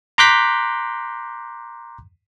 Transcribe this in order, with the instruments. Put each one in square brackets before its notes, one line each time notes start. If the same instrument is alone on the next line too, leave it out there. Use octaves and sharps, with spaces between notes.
[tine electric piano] A#5 C6 D6 F#6 G6 B6